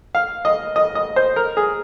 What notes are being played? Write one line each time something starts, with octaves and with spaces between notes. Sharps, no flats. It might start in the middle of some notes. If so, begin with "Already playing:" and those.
F5
D#5
D#5
D#5
C5
A#4
G#4